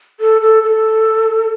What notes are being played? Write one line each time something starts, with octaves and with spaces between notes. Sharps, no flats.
A4
A4
A4